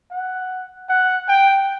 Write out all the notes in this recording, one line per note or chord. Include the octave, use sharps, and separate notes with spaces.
F#5
F#5
G5